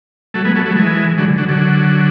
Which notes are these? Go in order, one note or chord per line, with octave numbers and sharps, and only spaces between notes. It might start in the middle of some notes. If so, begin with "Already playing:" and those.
F#3 A3
G#3 B3
F#3 A3
F#3 A3
E3 G#3
D3 F#3
D3 F#3
D3 F#3